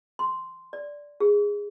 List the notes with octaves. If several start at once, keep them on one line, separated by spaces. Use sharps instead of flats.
C6
D5
G#4